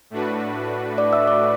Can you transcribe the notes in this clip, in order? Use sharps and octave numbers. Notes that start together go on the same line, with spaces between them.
A2 A3 D4 F#4 B4
D5 D6
E5 E6
D5 D6